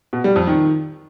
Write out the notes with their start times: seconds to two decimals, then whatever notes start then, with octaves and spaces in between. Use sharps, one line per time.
0.13 B2
0.24 G3
0.36 F2
0.47 D#3